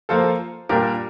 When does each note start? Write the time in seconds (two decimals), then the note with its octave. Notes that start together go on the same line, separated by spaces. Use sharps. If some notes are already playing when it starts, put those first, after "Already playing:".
0.09 F3 A#3 F4 A4 C5
0.69 A#2 G3 D4 G4 A#4